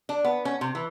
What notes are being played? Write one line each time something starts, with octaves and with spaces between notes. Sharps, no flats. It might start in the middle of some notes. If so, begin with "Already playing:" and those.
D4
B3
C#4
C3
E3